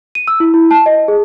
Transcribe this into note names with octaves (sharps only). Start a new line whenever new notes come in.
D#7
E6
E4
E4
A5
D#5
G#4